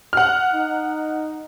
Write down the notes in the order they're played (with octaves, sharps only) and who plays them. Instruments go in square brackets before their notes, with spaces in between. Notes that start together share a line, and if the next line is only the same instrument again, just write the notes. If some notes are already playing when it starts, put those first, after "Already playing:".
[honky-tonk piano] F#5 F6
[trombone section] D#4